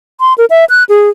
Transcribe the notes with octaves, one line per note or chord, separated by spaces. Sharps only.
C6
A#4
E5
F#6
G#4